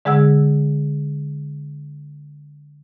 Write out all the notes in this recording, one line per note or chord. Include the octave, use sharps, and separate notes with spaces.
D3 G#3 G#4 F#5 E6